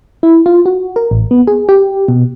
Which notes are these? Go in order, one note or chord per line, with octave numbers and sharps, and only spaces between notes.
E4
F4
F#4
A#4
A1
B3
G#4
G4
B2